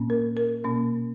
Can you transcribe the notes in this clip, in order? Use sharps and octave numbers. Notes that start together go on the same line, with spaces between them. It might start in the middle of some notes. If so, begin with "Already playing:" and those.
Already playing: A#2 A#3 C#4
A#4
A#4
B2 A#3 C#4